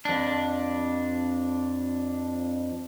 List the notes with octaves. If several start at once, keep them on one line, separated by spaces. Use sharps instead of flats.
F2 D4